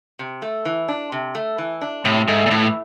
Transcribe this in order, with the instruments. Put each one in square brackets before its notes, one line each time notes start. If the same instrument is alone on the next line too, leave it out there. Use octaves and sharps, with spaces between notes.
[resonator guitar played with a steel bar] C3
A3
E3
D4
C3
A3
E3
D4
[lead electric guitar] A2 [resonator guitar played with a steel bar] C3
[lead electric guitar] G#2 [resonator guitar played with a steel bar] A3
[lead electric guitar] A#2
[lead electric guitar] A2 [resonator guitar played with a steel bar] E3